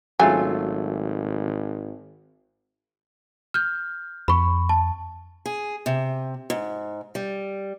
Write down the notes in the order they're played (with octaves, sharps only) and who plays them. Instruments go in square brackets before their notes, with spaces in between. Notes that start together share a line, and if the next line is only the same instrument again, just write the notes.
[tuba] G#1 [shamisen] C#3 G#5 [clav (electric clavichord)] F#3 A3 F4
[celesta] F6 G6
[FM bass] F2 [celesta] B5 C#6
[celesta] A5
[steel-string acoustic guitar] G#4
C3
G#2
G3